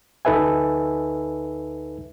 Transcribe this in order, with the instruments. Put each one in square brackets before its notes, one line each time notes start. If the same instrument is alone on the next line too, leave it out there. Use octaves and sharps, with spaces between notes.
[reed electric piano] D2 D#4 A4 B4 E5 G#5